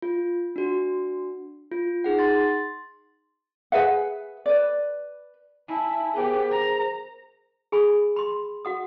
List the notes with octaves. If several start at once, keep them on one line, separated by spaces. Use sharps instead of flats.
F4
D4 F#4
F4
D#4 G#4 F#5
C6 A6
G#4 B4 E5 F#5
B4 D5
E4 G#5 A5
B3 G4 G#4 A#4 C5
A#5
G#4 G#5 B5
B5 C6
F#4 F#5 D#6